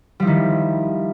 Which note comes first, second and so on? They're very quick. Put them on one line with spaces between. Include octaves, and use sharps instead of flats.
G3 F3 E4 D#3